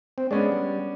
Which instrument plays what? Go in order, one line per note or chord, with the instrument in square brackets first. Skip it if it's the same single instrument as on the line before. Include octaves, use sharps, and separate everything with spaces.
[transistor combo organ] C4
[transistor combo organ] G#3 [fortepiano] B3 C#4 D4
[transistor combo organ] G3